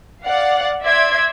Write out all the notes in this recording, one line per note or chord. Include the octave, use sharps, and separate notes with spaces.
D5 F5 F#5
D5 E5 C6 G#6